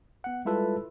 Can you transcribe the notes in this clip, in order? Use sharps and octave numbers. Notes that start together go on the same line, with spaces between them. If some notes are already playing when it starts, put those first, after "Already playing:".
B3 F#5
G3 G#3 E4 F4 A4 B4